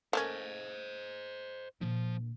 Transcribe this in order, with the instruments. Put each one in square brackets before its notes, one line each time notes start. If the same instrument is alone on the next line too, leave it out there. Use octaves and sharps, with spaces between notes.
[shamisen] A3 A#3 C#4 [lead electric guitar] C5 D#5
[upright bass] A#2 D3 [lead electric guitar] F3